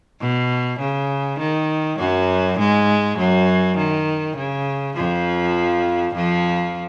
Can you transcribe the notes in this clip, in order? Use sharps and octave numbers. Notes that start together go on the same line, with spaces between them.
B2
C#3
D#3
F#2 F#3
G#2 G#3
F#2 F#3
D#3
C#3
F2 F3
F2 F3